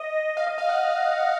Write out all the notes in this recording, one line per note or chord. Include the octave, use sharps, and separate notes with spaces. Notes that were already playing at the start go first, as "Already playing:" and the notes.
Already playing: D#5
F5
D#5
F5
F#5